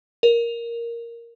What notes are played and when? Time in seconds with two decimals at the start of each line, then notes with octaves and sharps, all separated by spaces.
0.23 A#4